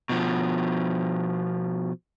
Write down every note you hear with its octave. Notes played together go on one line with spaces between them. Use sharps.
B2 F3